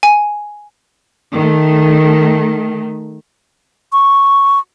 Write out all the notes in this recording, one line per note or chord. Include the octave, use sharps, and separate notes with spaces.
G#5
D#3 A3
C#6